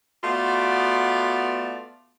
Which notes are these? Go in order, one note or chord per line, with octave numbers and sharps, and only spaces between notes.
A3 B3 F4 F#4 D5